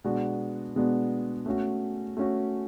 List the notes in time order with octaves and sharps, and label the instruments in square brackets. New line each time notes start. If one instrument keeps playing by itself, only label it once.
[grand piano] B2 G#3 B3 D4 F#4
B2 G#3 B3 D4 F#4
A3 C#4 F#4
A3 C#4 F#4